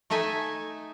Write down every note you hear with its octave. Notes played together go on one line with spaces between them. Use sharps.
A3 D#4 A4 E5 G#5